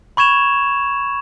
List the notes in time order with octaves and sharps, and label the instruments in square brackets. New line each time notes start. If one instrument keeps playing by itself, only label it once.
[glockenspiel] B5 C#6 G#6 E7 F7